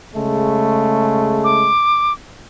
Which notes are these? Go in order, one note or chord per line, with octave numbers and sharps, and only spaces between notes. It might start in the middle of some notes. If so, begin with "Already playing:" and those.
C#3 G#3 A3
D6